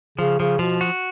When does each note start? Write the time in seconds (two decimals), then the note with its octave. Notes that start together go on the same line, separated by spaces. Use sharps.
0.18 C#3 F3
0.40 C#3 F3
0.59 B2 F3
0.81 F#4